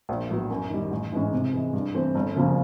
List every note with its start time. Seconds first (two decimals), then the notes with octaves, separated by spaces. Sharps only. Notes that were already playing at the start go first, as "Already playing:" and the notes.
0.09 A#1
0.29 A2 F#3 B3
0.50 F#2
0.70 D#3 G3
0.91 A1
1.12 G#2 E3 G#3 C#4
1.33 C3
1.53 E3 G#3
1.73 G2
1.94 E3 A3 C4
2.15 G1
2.35 F#2 C#3 F3 A#3